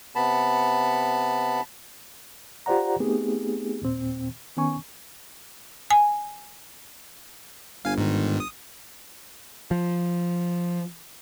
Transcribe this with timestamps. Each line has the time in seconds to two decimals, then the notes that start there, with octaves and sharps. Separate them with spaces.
0.16 C3 B3 A5 B5
2.66 F4 G4 C5 D5 F#5 A#5
3.00 A3 B3 C4 D#4 G4 G#4
3.82 D#2 A#2 C4
4.57 D#3 B3 C#4 G#5 C#6
5.91 G#5
7.85 G1 F5 G#5
7.98 G#2 D#3
8.40 D#6
9.71 F3